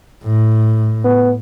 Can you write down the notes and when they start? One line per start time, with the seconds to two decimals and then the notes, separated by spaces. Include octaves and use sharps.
0.24 A2
1.04 B3